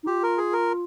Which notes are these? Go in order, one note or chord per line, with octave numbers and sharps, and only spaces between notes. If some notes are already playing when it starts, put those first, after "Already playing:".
D#4
F4 G4
A#4
G#4
A#4